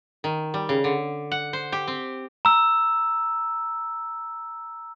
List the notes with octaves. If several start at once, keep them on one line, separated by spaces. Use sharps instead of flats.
D#3
G3
C#3
D3
F#5
C5
G4
C4
A#5 E6